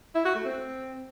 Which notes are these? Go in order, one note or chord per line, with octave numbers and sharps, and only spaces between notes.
E4
F#4
A3
C4